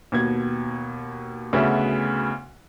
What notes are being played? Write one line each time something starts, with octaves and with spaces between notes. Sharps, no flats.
D#2 B2 G#6
D2 C#3 B3 F#4 E5